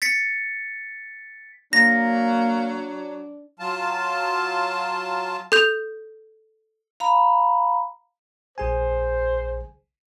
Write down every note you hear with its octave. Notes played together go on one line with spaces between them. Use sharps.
A6 B6 C#7
F#3 A#3 D4 A#6
F#3 F4 A5
A4 G6 F7
F5 A#5 B5
A#1 G#4 C5 G#5